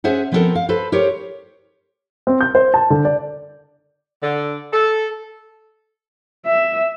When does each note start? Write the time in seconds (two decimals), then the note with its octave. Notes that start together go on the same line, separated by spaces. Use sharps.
0.04 C#4 G#4 C5 E5 F#5
0.32 F3 B3 C4 D#4 A4 A#4
0.55 F5
0.69 A4 B4 C5
0.92 G4 A#4 C5 C#5
2.27 C4
2.41 G6
2.55 C5
2.74 A5
2.90 D3
3.05 D5
4.23 D3
4.73 A4
6.46 E5